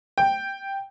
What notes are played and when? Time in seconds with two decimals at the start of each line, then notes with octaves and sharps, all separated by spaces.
0.18 G5